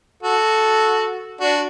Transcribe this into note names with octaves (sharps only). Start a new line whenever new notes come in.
F#4 A4
D4 F#4